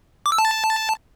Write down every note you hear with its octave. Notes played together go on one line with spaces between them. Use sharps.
D6
E6
A5